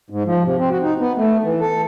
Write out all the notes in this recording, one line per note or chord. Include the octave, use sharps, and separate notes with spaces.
G#2
F3
C3
C4
F#4
D#4
B3
A3
E3
A4